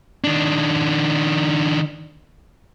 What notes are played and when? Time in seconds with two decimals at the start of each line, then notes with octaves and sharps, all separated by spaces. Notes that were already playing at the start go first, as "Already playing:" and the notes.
0.24 D#3 D4